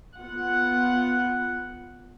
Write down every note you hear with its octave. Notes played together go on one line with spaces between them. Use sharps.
B3 F4 F#5